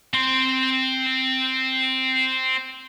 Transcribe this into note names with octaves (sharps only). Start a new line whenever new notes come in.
C4 C6